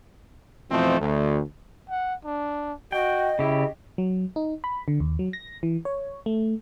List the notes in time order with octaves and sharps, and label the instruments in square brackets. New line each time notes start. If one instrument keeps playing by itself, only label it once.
[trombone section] F2 B2 E3 F3 A3 C4
D2
[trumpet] F#5
D4
[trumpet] F#4 [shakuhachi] D#5 [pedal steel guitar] G5
[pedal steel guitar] C#3 G4 [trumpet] E4
[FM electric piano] F#3
D#4
B5
D3
D#2
F#3
A#6
E3
C#5
A3